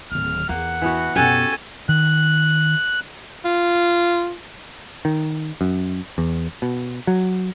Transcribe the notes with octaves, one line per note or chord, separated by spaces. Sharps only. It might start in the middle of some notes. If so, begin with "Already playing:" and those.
D1 D#3 F6
E2 A#3 F#5
E3 B3 F#4
F#2 B2 C#4 F#4 G4 A4 G#5
D#3 F#6
F4
D#3
F#2
E2
B2
F#3